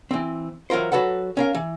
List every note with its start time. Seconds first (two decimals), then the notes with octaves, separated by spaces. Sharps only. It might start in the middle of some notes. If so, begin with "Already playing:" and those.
0.11 E3 C4
0.70 E3 F#3 F4 A#4 C5
0.92 F#3 F#4 A4 B4 F#5
1.37 C#4 A#4 F5
1.55 E3